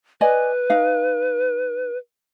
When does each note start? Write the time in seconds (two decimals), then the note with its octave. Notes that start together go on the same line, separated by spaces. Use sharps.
0.21 B4 D5 D#5 G#5
0.70 D#4 F5